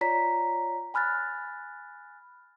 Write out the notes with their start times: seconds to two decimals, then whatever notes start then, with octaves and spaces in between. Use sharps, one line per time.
0.01 F4 C#5 D5 A#5 B6
0.94 G#5 B5 F6 F#6 A6